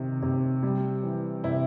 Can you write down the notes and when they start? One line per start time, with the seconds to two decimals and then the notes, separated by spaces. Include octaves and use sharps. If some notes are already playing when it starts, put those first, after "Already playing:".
Already playing: C3 D#3
0.22 C3
0.63 G3
1.03 E3
1.44 C3 E4